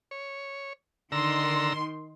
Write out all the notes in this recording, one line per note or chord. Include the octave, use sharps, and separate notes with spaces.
C#5
D3 D#3 A#5 C6 E6